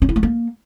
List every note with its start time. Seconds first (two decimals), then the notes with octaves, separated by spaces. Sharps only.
0.02 C#4
0.09 E4
0.16 A3
0.23 A#3